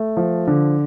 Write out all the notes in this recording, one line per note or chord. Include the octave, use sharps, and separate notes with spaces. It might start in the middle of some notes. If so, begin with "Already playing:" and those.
Already playing: A3
F3
D3